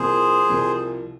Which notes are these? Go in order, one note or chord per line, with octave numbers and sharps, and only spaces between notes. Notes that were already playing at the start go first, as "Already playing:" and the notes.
Already playing: C2 C3 F3 A#3 G#4 C5
C2 C3 F3 A#3